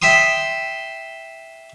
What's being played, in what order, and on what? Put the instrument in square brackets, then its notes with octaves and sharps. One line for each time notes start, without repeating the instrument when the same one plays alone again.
[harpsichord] E5 G5 C6 D#6